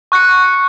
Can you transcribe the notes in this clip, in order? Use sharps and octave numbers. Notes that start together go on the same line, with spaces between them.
C#6 F#6 C#7